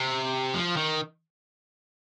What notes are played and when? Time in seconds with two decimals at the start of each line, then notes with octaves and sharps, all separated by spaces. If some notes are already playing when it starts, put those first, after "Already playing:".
Already playing: C3
0.54 F3
0.77 D#3